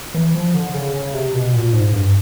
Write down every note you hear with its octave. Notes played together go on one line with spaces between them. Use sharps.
E3
F3
D3
C#3
C#3
C3
B2
A#2
G#2
G2